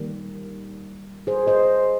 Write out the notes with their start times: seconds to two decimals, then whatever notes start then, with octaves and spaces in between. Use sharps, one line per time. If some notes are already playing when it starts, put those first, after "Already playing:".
Already playing: D#3 G3 A#3
1.27 G#4 C5
1.47 C5 D#5